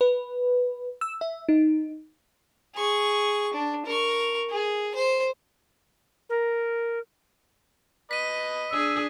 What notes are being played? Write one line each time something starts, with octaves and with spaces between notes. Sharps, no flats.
B4
E6
E5
D#4
G#4 C#6
D4
A#4 C#6
G#4
C5
A#4
B4 D#5 B6 D#7
D4 G#4 E6